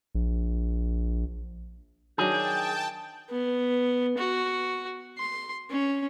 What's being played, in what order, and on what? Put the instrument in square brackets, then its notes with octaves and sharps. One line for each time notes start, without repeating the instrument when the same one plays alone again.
[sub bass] A#1
[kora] D#3 F#3 D4 [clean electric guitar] G#4 [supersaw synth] G5 A5 [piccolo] G6
[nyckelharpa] B3
F#4
C6
C#4